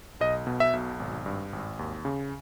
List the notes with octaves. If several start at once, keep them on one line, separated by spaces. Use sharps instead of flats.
B1 D#5
B2
E5
B1
G#1
G2
G#1
D#2
C#3